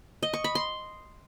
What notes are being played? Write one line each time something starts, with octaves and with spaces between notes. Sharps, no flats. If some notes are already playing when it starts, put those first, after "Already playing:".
D#5
C#6
B5
C6